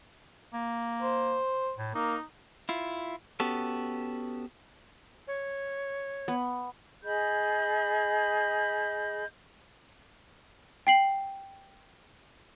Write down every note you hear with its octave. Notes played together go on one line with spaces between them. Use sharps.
A#3
C5
A2
A#3 D#4
E4 F4
B3 C#4 F#4 G4 A4
C#5
B3
G#4 D#5 B5 G6
G5 C7 F#7